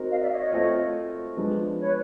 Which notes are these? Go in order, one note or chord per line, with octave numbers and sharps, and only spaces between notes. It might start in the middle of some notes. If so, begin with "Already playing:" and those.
Already playing: C4 D#4 F#4 A#4
D#5 F5
D5 E5
C#5 D#5
C#5 D#5
A3 C4 F4
F3 G#3 B3 D4
B4 C#5